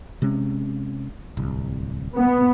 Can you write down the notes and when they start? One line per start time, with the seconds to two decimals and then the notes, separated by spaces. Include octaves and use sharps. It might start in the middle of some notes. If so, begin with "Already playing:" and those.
0.22 C3 G#3 C#4
1.37 D1 C2
2.17 B3